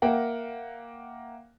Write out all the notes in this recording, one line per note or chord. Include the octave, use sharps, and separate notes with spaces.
A#3 A#4 E5 F#5 G5